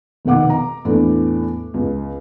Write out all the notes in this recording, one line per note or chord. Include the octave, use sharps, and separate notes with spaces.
F1 B2 D#3 F#5 D6
A#5
E2 A2 D4 A4
C#2